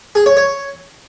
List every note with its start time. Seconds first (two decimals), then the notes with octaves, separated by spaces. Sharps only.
0.15 G#4
0.26 C#5
0.37 C#5